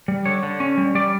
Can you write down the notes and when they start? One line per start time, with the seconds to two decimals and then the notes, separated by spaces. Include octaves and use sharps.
0.08 G3
0.25 D3 C#5
0.43 D3
0.60 C#4
0.78 G3
0.95 G3 D5